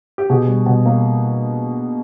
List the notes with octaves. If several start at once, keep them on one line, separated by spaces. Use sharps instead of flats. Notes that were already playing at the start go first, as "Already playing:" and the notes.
G4
B2 G#4
G3
B2
A#3